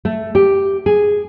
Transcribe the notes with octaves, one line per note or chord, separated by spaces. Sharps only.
A3
G4
G#4